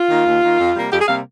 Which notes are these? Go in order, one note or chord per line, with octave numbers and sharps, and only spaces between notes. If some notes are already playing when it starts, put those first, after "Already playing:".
Already playing: F4
D#3 A#3
D#2
D#3 A#3
F2
C3 G3 A#3
F2 G4
G#4
C3 G3 A#3 F5